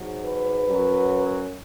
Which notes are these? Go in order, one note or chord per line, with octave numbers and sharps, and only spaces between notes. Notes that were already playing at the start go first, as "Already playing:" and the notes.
Already playing: G#2 F#3
B4
F#2 F#3